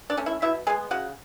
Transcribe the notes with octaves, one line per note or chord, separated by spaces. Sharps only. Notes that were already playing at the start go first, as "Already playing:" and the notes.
D4 D5
A3 C#4
E4 E5
B2 E4 E5
G#3 B3 G#4 G#5
C#3 F#4 F#5